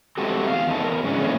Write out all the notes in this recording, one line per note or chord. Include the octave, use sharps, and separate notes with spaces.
G#3 A3 C4 F#4 G4 A4
E2 G#3 F5
E2 D#3 A3 A5
E2 A#4
G#2 C#3 F3 C#4 D4
A#2 E3 A3 C#4